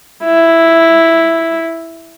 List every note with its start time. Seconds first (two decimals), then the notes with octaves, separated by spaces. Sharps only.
0.24 E4